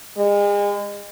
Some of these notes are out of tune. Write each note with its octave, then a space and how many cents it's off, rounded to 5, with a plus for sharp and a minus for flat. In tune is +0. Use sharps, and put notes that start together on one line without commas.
G#3 -35